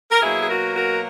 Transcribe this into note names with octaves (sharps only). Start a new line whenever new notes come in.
A#4
B2 F#3 A#3 E4 G#4
G#4
F#4 A#4
F#4 A#4